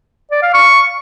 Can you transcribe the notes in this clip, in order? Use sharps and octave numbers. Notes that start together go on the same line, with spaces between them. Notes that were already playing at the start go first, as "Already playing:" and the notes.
D5
F5
C#6